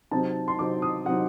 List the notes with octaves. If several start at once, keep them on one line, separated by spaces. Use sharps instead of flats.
C3 F#3 C4 D#4 A5
C6
C3 F#3 C4 D#4 D6
D#6
C3 F#3 C4 D#4 F#5